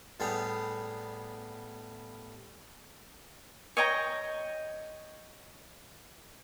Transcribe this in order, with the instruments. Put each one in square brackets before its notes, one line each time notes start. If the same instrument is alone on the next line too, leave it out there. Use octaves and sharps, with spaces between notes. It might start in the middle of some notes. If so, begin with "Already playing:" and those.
[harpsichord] A2 G3 B3 G#4
[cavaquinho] C#5 D#5 G5 A#5